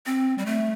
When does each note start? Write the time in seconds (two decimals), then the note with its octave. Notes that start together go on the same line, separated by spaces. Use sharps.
0.06 C4
0.38 G3
0.46 A3